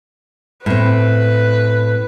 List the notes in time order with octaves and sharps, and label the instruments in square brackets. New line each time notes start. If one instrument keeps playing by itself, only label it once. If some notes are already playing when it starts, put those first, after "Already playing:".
[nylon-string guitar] A2 C4 [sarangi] B4